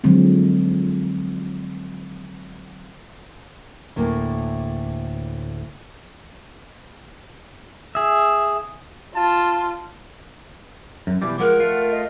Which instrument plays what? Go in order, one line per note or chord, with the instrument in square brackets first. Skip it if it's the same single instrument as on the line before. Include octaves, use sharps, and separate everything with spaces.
[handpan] D3 F3 F#3 G#3 C4
[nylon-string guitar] D2 A2 A#3
[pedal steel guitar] G#4 E5
[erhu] F4 [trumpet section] A5
[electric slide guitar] F#2
[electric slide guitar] B2 E3 G3 [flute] D6
[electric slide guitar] F3 G#3 [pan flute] A#4 [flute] F#5
[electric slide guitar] A3 F4
[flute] D#5